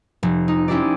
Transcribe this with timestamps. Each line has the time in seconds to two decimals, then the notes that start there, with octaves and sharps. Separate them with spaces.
0.23 F1
0.48 D#4
0.68 C#4 E4 G4 C5 D5